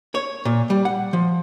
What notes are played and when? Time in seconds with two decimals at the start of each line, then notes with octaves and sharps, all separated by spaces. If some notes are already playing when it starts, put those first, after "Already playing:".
0.15 C#5
0.45 A#2
0.70 G3
0.85 F#5
1.13 F3